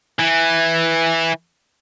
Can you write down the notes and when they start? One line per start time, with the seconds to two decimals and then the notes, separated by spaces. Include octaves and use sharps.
0.19 E3